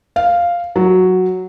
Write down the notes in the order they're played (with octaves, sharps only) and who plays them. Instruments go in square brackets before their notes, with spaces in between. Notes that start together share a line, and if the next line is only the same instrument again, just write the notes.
[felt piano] F5
F#3